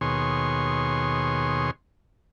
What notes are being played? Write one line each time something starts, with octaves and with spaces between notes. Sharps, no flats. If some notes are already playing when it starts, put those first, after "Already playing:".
D#2 B2 G#4 C#5 C6